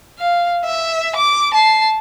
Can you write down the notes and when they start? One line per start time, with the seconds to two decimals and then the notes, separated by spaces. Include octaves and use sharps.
0.19 F5
0.65 E5
1.16 D6
1.54 A5 C7